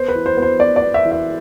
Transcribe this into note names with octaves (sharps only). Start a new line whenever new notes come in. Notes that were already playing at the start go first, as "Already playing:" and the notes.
Already playing: B3 C5
B4
E3
C5
B3
C5
B3 D5
D5
B3
E5
E3
E5